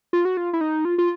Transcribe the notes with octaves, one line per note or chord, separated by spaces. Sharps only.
F4
F#4
F4
E4
D#4
F4
F4